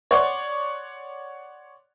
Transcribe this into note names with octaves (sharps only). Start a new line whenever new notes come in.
C#5 D5 F#5 C6 C#6